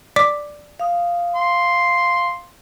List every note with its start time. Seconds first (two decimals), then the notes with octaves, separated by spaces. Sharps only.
0.16 D5 D6 B6
0.80 F5 D#6
1.36 C6